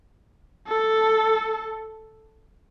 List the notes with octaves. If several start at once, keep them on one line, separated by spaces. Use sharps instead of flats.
A4